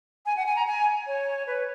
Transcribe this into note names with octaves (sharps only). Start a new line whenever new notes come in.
G#5
F#5
G#5
A#5
G#5
C#5
B4